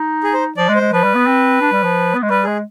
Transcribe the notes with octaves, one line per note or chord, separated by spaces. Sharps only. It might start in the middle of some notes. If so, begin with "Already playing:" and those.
Already playing: D#4
G#4
C5
F3 D5
G#3
C5
G#3
F3 B4
G3
B3
C4
D4
G3
F3
B3
G#3
G3 B4
G#3 G#4